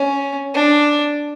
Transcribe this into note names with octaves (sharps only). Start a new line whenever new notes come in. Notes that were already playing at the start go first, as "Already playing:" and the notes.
Already playing: C#4
D4